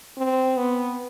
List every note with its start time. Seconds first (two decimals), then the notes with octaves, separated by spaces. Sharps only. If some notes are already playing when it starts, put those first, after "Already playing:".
0.18 C4
0.57 B3